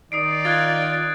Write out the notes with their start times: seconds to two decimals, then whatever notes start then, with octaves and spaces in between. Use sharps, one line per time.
0.12 D#3 D#4 D5 D#6 C7 D7
0.45 F4 F#6 G#6 A6